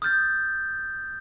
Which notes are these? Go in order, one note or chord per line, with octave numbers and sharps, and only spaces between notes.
D#6 F6 G6 A6